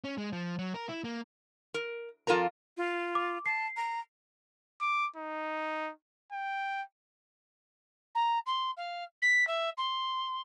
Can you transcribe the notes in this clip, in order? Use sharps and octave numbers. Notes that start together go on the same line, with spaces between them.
C#4
G#3
F3
F#3
A#4
E4
A#3
A#4
F2 F4 A4 A#4 A#5
F4
D6
A5 C7
A#5
D6
D#4
G5
A#5
C6
F5
B6
E5
C6